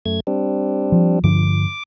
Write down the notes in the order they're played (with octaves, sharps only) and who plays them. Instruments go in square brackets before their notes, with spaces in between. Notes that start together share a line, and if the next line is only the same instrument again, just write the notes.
[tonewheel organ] F#2 A3 G#6
G3 C4 D4
[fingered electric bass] F3
[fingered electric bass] G2 D3 F3 [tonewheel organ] D6